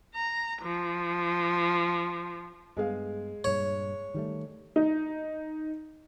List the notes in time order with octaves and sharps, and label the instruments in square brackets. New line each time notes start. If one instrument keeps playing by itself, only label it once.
[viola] A#5
F3
[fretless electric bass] G2 B3 [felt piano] G#3 G#4 F5
[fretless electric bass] G2 A#2 [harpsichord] C#5
[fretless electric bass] D#3 G3 A3
[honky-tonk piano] D#4